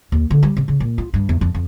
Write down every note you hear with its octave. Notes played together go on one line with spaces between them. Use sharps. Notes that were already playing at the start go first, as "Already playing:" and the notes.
D#2
D3
G3
C3
C#3
A#2
F4
G2
E2
F2
F2